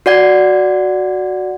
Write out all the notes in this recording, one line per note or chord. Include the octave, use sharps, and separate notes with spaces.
F#4 D5 F#5 G#6